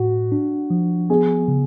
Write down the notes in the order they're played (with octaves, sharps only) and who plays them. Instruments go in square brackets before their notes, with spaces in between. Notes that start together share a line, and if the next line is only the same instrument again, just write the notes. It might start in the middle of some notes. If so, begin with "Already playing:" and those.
Already playing: [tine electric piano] A2 [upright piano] F#4
[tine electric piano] D4
F3
[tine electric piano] B3 [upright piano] G#4
[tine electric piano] C#3